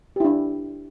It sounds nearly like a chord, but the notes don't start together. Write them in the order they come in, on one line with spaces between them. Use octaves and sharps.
G4 E4 D4